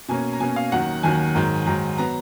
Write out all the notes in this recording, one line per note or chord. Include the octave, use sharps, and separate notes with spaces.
B2 A#3 C#4 G#5
A#5
B2 A#3 C#4 G#5
F5
D#2 D#3 F#3 F#5
D#2 D#3 F#3 G#5
G#2 D#3 F#3
G#2 D#3 F#3 A#5
F#3 B3 A#5